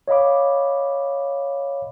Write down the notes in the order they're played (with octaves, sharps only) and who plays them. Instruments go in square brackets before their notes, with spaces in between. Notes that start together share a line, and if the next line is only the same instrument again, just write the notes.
[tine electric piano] C#5 D#5 F5 B5 D6